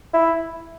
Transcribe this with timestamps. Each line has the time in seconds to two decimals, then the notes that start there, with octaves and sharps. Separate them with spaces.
0.14 E4